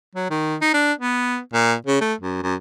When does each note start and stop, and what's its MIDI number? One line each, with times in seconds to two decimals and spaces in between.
0.15 0.27 54
0.30 0.56 51
0.61 0.69 63
0.74 0.93 62
0.99 1.39 59
1.54 1.74 46
1.86 2.00 49
2.01 2.14 57
2.21 2.40 42
2.43 2.54 42